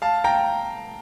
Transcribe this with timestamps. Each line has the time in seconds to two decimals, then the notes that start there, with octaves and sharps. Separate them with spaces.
0.02 F5 A5
0.24 G5 A#5